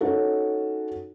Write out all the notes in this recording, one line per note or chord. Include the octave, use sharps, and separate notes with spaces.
C#4 D#4 F#4 A4